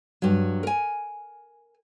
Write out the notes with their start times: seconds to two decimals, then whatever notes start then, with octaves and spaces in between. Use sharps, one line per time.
0.22 G2 F#3
0.63 A#4 G#5